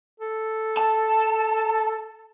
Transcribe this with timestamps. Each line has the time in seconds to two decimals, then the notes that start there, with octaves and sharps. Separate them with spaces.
0.20 A4
0.77 A5